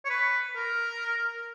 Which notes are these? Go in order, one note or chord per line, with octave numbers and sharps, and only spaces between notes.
C#5
B4
A#4